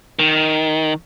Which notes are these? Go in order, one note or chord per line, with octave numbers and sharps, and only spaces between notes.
D#3